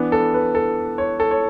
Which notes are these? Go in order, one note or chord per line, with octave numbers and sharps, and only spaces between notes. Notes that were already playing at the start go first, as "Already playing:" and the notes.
Already playing: E3 B3 D4
A4
B4
A4
C#5
A4
C#5